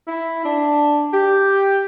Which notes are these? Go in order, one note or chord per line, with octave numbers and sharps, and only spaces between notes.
E4
D4
G4